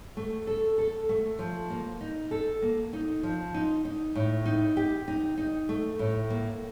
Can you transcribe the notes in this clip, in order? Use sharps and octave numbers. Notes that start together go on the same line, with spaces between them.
A3
A4
A4
A3
F3
A#3
D#4
A4
A#3
D#4
F3
D#4
D#4
A2
D#4
G4
D#4
D#4
A3
A2
A#3